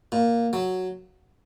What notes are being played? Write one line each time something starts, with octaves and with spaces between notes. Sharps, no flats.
A#2
F#3